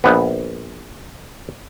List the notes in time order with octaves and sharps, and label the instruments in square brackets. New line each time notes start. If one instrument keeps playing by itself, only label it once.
[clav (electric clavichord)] A#1 B3